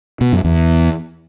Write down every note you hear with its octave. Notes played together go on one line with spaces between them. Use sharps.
B2
F#2
E2